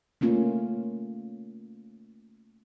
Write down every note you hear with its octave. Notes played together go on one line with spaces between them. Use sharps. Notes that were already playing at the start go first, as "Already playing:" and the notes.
A3 A#3 C#4 F4